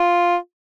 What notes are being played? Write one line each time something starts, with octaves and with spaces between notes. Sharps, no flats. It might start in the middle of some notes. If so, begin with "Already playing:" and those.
Already playing: F4